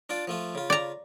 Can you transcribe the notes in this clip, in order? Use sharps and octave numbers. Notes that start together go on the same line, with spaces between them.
D4 F4 D5
F3 A3 F4
C#3 F4
D5 A#5